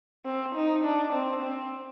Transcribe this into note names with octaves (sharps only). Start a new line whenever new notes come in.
C4
D#4
D4
C4
C4